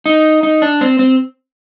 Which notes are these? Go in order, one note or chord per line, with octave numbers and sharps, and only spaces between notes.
D#4
D#4
D4
C4
C4